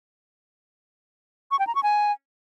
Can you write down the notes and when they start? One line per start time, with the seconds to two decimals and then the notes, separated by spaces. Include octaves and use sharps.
1.51 C#6
1.59 G5
1.67 A#5
1.75 C#6
1.83 G#5